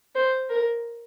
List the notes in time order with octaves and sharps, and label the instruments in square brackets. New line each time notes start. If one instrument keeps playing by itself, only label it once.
[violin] C5
A#4